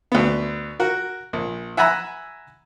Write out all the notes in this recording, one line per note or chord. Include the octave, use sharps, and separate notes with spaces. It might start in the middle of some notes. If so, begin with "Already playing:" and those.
D2 B3
F#4 A#4
A#1
E5 F#5 G#5 A#5 B5 E6